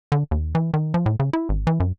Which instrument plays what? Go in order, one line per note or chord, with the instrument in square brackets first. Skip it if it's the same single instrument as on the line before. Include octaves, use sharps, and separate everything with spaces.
[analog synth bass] D3
D#2
E3
D#3
F3
A2
C#3
E4
G#1
E3
F#2